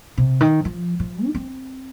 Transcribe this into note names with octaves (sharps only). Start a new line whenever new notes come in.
C3
D#3
F3
F3
D#4
C4